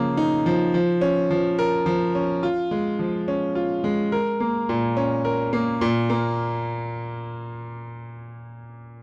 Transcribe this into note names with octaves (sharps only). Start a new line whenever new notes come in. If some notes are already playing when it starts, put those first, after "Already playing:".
Already playing: C#3 F3 A#3
D#4
F3
F3
C#4
F3
A#4
F3
C#4
F4
G#3
F3
C#4
F4
G#3
A#4
A#3
A#2
C#4
A#4
A#3
A#2
A#3